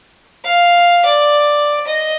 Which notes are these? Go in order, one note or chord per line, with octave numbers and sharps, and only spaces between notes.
F5
D5
D#5